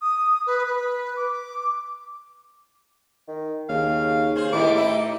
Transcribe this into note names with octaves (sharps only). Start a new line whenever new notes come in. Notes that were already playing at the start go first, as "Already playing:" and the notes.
D#6
B4
B4
D6
D#3
D#2 C#3 F5
G#4 C5
A2 D#3 G3 B3 D6
D#4 E4 E5